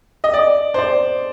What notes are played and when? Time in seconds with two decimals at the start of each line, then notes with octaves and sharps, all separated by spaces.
0.24 D#5
0.34 D5
0.74 C5
0.78 D5